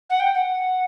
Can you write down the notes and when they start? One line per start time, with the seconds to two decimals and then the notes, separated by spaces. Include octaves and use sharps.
0.09 F#5
0.20 G5
0.34 F#5